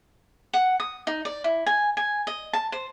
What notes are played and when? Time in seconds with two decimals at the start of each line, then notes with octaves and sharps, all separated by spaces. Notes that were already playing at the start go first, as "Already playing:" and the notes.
0.54 F#5
0.80 D#6
1.07 D#4
1.25 D5
1.44 E4
1.66 G#5
1.97 G#5
2.27 D#5
2.53 A5
2.72 C5